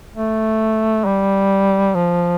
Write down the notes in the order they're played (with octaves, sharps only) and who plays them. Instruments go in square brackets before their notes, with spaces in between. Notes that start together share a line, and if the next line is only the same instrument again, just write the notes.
[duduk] A3
G3
F3